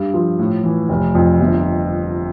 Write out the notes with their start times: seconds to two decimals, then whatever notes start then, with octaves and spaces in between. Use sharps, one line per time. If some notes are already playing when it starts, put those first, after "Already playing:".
Already playing: G2
0.14 F3
0.39 A2
0.63 E3
0.89 F1
1.15 F2
1.40 G1